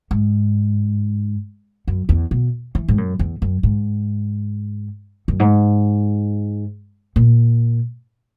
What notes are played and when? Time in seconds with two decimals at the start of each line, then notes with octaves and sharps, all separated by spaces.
0.11 G#2
1.87 F#2
2.09 E2
2.31 B2
2.75 E3
2.88 G#2
2.98 F#2
3.19 E2
3.42 F#2
3.63 G#2
5.28 F#2
5.40 G#2
7.16 A#2